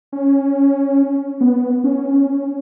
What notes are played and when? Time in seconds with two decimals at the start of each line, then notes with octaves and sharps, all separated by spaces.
0.12 C#4
1.41 B3
1.84 C#4